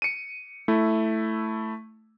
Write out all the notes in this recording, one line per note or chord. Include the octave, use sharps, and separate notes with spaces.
C#7 D#7
A3 E4